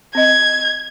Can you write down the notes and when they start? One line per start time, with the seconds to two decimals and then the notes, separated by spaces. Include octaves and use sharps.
0.15 C4 D#5 G#6